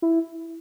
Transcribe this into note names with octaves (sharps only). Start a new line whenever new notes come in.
E4